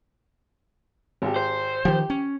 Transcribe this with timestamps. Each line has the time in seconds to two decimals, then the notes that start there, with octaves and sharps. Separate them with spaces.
1.22 G#1 G4
1.36 C5
1.85 D#3 F3 G4
2.10 C#4